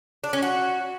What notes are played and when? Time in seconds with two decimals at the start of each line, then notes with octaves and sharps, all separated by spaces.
0.24 D4
0.33 C#4
0.42 F#4